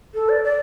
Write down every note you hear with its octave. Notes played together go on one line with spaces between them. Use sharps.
A4
D5
D5